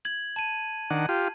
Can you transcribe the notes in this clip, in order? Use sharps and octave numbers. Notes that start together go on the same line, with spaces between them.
G#6 F#7
A5 D#7
D#3 D4 F#5
F4 G4